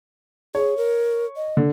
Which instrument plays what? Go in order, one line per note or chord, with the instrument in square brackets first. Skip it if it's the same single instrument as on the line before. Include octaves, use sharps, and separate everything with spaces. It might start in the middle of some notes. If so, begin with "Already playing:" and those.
[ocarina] G#4 [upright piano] C#5
[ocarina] A#4
D#5
[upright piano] D3